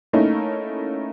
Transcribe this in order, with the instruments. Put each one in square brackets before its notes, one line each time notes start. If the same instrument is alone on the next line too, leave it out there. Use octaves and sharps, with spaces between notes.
[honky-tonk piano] A3 A#3 C#4 D#4 E4